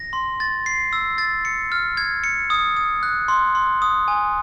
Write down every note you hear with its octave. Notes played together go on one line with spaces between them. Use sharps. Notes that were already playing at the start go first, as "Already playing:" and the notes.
Already playing: A#6
C6
A6
C7
E6
A6
C#7
F6
G#6
C#7
D#6
D#6
F#6
C6
C6
D#6
G#5